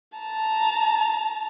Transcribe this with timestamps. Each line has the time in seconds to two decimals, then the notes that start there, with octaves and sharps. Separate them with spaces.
0.18 A5 A#5